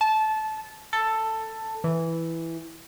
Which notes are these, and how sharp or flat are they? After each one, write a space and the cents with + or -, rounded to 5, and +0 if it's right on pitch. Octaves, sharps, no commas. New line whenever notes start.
A5 -20
A4 +10
E3 +0